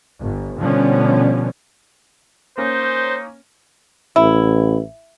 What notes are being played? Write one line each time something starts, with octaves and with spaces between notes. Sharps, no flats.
G1
B2 D3 F3 G3 B3 C#4
A#3 C#4 D#4 C5
A1 E4